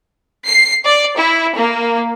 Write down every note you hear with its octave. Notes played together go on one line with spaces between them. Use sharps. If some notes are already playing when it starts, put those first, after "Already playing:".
C7
D5
E4
A#3